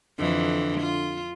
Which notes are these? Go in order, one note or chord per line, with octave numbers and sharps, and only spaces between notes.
F2 D3 E3
F4